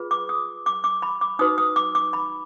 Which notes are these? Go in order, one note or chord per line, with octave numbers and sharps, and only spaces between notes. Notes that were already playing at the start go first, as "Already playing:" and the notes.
Already playing: F4 G#4 B4
D6
D#6
D6
D6
B5
D6
D#4 F#4 B4 D#6
D#6
D6
D6
B5